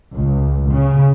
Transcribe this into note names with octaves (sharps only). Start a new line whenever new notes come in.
C#2
C#3